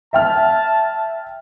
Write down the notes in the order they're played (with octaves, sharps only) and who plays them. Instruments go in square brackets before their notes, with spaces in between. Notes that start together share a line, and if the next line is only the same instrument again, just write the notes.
[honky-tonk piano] E5 G5 F6 [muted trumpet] A5